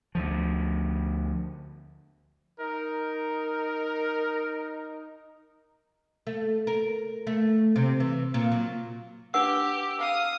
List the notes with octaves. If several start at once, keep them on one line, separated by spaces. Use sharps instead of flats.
D2 F3
D#4 A#4
A3
A#4
A3
C3
E3
A#2
F#3
D4 G4 B4 F#5 E6
F5 D#6